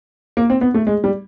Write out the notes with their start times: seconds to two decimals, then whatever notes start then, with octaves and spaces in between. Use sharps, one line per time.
0.37 A#3
0.50 C4
0.61 B3
0.74 A3
0.87 G#3
1.04 G3